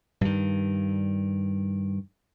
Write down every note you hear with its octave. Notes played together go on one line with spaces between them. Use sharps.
G2 D#3